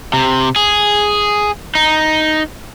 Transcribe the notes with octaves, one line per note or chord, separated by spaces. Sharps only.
C3
G#4
D#4